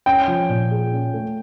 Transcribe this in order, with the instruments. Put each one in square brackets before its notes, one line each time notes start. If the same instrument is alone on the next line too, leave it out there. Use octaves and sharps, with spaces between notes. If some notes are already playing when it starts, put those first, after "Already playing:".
[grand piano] C#4 [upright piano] G5
[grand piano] F3
A#2
G#4
C#4
A3